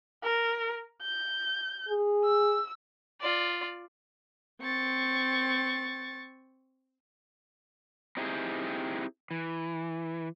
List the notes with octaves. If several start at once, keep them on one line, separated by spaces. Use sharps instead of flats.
A#4
G6
G#4
E6
F4 D5
C4 C#6 A6
C4 D#4 E4 G4 G#4
E3